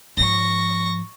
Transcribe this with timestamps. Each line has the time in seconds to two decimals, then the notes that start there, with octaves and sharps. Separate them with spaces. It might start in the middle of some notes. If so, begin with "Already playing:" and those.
0.17 G#2 F3 C#6 A#6